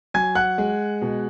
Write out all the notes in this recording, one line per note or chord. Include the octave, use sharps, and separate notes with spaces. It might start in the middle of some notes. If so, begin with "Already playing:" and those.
F#3 G#5 G#6
F#5 F#6
G#3
B2